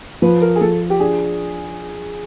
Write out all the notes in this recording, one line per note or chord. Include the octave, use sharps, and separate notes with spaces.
F3 B4
A#4
G#4
F3 A4
G4
D4 G#4